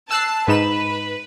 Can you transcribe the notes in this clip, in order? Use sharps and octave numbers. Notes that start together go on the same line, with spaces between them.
A5 E6 F#6 C7
G#2 D#4 B4 E7